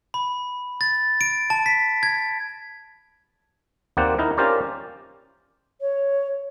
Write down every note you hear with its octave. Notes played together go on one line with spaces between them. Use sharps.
B5
A6
D7
A5
B6
G#6
D#2 A#3 C4 D5 F#5 G5
D#4 E4 A#4
C#4 F4 G4 A#4 C5 D5
C#5